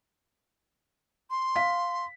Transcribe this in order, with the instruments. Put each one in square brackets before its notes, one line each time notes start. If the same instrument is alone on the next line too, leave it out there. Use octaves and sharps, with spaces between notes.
[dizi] C6
[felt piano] F5 B6